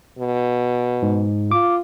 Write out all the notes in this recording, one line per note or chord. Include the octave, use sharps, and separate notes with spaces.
B2
G#2
F4 D6